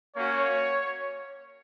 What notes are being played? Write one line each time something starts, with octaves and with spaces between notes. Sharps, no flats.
A#3 C#4 F#4 C#5